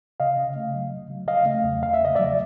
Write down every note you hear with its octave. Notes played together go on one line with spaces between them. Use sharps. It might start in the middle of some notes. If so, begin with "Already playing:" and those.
C#3 D#5 F5
C#3
A3
F#3
C#3
F#3
C#3 D#5 F5
A3
E2
C#3 F5
E5
A3 D#5
F#3 D5 E5